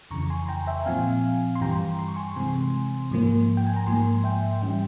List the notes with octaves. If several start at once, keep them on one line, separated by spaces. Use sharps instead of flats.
F2 C#3 E3 A#5 C#6
G#5 C6
G5 A#5
E5 G5
A#2 F3 C4 F5 G#5
C6
G2 E3 G3 G5 A#5
C6
C#6
G#5 C6
C3 E3 G#3 C4 G#5 C6
G#2 F3 A#3
G5
G#5
A#5
G#2 F3 A#3 G#5 C6
E5 G5
G#2 E3 G3 C#4 E5 G5